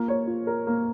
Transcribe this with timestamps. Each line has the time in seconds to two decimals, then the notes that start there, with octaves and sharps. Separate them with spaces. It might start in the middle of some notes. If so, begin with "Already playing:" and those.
Already playing: A#3 F4
0.08 C#5
0.27 F4
0.47 A#4
0.67 A#3